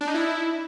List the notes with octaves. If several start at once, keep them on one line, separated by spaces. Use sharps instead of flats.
D4
D#4
E4